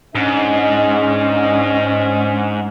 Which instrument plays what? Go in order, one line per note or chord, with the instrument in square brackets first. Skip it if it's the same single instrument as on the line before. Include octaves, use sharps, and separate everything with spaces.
[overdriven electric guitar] G#2 [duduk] C#4 [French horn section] D4 D#5